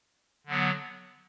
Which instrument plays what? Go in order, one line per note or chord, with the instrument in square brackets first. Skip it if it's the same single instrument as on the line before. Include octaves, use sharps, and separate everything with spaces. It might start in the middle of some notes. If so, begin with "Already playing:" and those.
[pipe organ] D3 F#3 B3